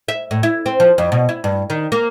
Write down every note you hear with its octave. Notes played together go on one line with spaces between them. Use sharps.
E5
A2
E4
C4
F3
F2
B2
E4
G2
D#3
A#3